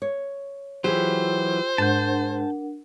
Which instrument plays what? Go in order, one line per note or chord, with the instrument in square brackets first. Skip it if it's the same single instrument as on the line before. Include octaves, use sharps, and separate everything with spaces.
[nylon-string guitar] C#5
[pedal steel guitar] E3 F#3 [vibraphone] F4 E6 [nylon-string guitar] G4 G#4 [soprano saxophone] C5
[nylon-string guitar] G#2 [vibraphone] D4 A#4 F#5 [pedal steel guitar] A5 G6